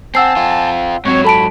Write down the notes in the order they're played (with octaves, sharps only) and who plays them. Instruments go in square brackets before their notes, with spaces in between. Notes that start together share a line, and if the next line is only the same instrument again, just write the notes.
[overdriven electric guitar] C4 [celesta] F#5 E6 C7 [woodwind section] G#5 A5
[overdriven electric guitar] C4 F4
[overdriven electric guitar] G#2 F#3 [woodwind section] C4 C#5
[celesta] A4 A5 D7 [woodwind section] B5